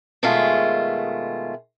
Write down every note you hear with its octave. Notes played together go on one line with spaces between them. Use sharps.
B2 D#3 G#3 A3 F4